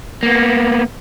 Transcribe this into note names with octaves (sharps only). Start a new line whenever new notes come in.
A#3 B3